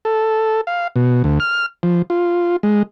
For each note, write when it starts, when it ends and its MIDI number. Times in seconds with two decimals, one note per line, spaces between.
0.05 0.61 69
0.67 0.88 77
0.96 1.23 47
1.24 1.39 38
1.40 1.66 89
1.83 2.02 53
2.10 2.56 65
2.63 2.83 56